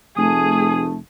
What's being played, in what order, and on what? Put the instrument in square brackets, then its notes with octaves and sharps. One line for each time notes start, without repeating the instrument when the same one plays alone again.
[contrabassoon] F1 [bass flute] A3 [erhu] G#4 [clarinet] D#6